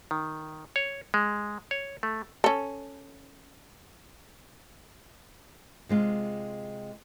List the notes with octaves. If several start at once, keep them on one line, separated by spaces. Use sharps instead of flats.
D#3
C#5
G#3
C#5
A3
C#4 A4
C3 G#3 F4